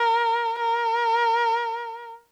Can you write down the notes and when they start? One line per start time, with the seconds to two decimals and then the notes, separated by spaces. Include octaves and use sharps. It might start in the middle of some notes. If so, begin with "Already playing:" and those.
Already playing: A#4
0.59 A#4